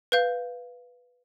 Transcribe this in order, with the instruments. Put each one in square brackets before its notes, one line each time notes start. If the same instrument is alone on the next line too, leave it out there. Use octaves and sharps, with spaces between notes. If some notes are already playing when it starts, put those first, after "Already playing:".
[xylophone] B4 F5 G6